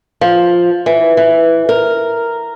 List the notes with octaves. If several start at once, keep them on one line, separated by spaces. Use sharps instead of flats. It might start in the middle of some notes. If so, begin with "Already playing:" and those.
F3
E3
E3
A#4